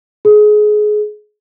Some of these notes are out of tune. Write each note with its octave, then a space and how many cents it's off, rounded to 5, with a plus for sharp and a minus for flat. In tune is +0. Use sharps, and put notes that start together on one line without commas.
G#4 +25